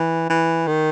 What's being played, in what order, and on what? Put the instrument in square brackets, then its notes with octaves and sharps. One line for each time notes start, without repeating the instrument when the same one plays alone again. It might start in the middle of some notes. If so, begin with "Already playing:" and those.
Already playing: [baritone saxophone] E3
E3
D#3